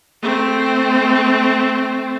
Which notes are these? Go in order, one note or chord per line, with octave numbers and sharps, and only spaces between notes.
A3 C4